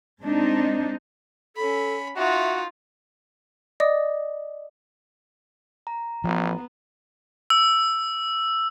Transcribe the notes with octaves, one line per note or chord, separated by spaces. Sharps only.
G#3 C4 D4 D#4
C#4 A4 B5
D#4 F4 F#4 E5
D5 D#5 D6 D#6
A#5
A1 F3 B3
E6